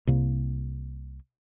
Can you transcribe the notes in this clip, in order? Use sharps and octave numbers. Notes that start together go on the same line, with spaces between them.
C2 C3 A#3